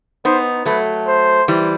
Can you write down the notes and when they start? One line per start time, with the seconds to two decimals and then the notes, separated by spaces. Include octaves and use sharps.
0.25 B3 D#4 C5
0.65 F#3 A3 B4
1.07 C5
1.48 E3 G3